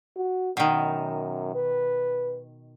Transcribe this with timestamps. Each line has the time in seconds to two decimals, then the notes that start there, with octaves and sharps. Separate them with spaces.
0.17 F#4
0.57 F#2 B2 D#3
1.55 B4